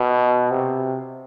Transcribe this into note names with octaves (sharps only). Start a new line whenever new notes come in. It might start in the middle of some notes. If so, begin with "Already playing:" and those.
Already playing: B2
C3